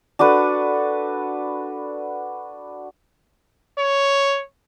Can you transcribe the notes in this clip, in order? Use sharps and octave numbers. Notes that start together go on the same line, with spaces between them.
D4 F#4 A4 B4
C#5